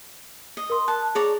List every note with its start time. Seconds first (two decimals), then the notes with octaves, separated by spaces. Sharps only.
0.57 D#5
0.70 A#4 C6
0.88 A5 F#6
1.15 G#4 C#5 D5 A#5